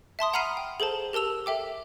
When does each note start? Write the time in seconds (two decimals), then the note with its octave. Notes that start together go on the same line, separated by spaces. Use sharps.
0.19 E5 A5 C6 D#6
0.33 F#5 A#5 B5 F6 C7 D#7
0.57 G5
0.80 G#4 A4 C5 A5
1.13 G4 A#4 A5 E6 F7
1.46 A4 E5 G5 D6